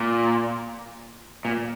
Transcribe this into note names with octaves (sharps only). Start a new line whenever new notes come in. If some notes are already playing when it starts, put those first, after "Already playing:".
Already playing: A#2
A#2